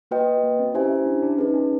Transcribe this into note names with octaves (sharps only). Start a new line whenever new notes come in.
A#3 F#4 B4 D#5 G5
A#3
C4
C#4 E4 G4 C5 E5 G#5
D4
D4
C#4 D#4 G#4 B4
C#4